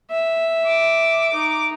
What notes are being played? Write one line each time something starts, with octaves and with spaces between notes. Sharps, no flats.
E5
D6
D#4